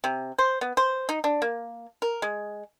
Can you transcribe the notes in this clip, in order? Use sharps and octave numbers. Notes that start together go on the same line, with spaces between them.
C3
C5
B3
C5
D#4
D4
A#3
A#4
G#3